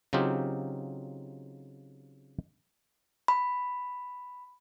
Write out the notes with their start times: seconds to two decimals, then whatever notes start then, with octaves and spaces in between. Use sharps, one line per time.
0.13 C#3 F#3 C4 D#4 F4 G4
3.28 B5